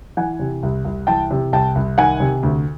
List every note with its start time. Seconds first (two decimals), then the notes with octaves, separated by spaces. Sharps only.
0.17 E3 F#5 G#5
0.39 C3
0.63 C2
0.85 C2
1.07 E3 G5 A5
1.31 C3
1.53 C2 G5 A5
1.75 C2
1.98 D#3 F#5 G#5
2.20 C3
2.43 D2